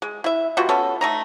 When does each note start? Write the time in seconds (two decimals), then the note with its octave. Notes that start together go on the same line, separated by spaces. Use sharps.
0.02 G#3
0.24 E4 E5
0.57 B2 G3 F4 F#4
0.69 B3 C#4 A4
1.01 A3 D#4 A#5